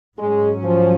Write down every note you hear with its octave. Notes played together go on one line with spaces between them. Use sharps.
G#2 F#3 G#3 C#4
F3